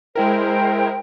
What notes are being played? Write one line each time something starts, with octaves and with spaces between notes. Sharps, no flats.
G#3 E4 A#4 C5 G5